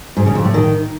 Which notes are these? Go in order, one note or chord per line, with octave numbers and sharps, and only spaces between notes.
G#2
C#3
F2
A2
D#3